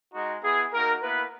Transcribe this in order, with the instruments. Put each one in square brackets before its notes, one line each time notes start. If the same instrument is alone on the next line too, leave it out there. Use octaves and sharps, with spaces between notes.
[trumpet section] G#3 D#4 F#4
B3 E4 G#4
A#3 D#4 F#4 A#4
A#3 B3 E4 B4